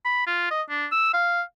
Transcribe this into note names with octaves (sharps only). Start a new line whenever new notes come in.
B5
F4
D#5
D4
E6
F5